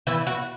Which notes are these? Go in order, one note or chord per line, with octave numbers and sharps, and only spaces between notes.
E3 E4
F#4